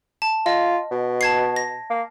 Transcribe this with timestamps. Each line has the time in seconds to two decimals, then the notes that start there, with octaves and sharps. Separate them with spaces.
0.22 A5
0.46 F4 D#5
0.92 B2
1.21 A5 G#6 C7
1.56 A#6
1.90 A#3